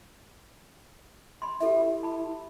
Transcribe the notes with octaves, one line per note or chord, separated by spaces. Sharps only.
B5 C6
E4 G4 A4 E5
A5 B5